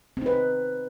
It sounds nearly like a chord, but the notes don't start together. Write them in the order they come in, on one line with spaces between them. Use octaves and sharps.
C4 D#4 B4